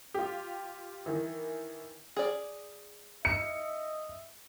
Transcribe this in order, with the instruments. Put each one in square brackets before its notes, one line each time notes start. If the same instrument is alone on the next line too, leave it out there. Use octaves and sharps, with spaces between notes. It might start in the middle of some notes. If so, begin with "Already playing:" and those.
[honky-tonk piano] F4 G4
D#3 E3
[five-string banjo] G#4 D5
[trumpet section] D#5 E5 [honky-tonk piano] C#7